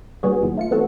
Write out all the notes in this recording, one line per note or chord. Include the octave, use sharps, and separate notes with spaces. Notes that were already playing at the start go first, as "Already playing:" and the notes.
A#2 D3 G3 B3 F#4 G#4
E2 A#2 D#3 F#3
A3 F4 C#7
E3 A3 B3 C4 F#4 A4